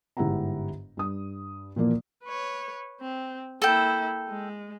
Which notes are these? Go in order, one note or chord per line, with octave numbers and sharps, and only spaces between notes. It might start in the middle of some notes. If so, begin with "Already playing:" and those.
G1 G#2 E4 G4 F#5 A#5
G2 D#6
A#2 E3 F3 A#3 D5
B4 C#5
C4
A#3 E4 A4 G5
G#3